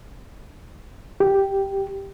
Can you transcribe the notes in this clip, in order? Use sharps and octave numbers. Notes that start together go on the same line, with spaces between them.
G4